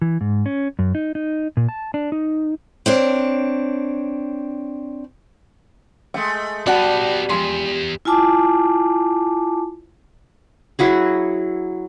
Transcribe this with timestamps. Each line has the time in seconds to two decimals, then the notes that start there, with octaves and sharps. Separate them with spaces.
0.02 E3
0.21 G#2
0.46 C#4
0.79 F#2
0.95 D#4
1.15 D#4
1.57 A#2
1.69 A5
1.94 D4
2.12 D#4
2.86 C4 D4 C#5
6.14 G#3 A3 G5
6.66 G3 B3 D#4 F#4 D5 F#5 A5
7.29 E2 F3 G#3 C6
8.05 E4 F4 G#5 A5 D6
10.79 F#3 E4 F#4 G#4